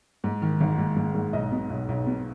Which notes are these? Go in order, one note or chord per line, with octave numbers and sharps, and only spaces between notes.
G#2
D#3
G#1
G#2
G#2
G#2
B1 D#5
B2
B1
B1
B2